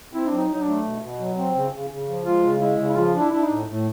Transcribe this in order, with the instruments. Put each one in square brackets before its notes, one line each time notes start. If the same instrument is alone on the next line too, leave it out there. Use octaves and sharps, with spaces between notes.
[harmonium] C4 [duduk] E4
[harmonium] F#3 [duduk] D4
[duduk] D#4
[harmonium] F#3 [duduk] D#4
[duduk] D4
[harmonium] A3
B2
B2
F#3
C4
C#3
C#3
C#3
F3
[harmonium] G#3 [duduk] F4
[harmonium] C#3
[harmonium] G#3 [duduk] E4
[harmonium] C#3
[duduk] E4
[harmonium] F3 [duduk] F4
[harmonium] D4
[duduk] E4
[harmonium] D4 [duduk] E4
[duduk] D#4
[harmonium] A2
A2